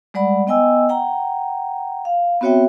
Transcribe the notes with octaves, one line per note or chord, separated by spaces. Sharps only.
G3 G#3 D5 F#5 B5
B3 D#5 G5 G#5 E6
F#5 G5 A#5
F5
B3 C4 F#4 C#5 E5 G5